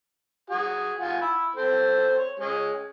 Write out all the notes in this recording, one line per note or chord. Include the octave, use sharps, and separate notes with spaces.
F#4 G#4
F4 F#5 G#5
B5 E6
C4 A4 C5
C#5
G#3 C#4 G#4